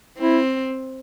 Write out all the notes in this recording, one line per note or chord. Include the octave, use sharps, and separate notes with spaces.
C4 E4